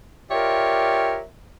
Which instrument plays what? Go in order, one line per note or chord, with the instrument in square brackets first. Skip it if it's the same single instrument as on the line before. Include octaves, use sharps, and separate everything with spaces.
[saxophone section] F4 G4 A#4 C#5 D5 E5